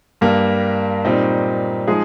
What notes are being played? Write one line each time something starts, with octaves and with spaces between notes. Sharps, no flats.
G2 G3 A#3
A#2 G3 C4 D#4
F3 G#3 D#4 G#4